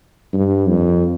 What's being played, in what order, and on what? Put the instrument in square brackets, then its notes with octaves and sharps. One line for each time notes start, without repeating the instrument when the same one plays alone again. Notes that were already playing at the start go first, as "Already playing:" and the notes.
[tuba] G2
F2